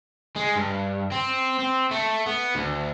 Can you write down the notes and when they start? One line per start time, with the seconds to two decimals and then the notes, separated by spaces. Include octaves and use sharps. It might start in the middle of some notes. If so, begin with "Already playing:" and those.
0.36 G#3
0.56 G2
1.12 C4
1.59 C4
1.91 A3
2.26 B3
2.55 D2